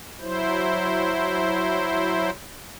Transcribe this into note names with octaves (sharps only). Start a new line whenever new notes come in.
F#3 E4 C5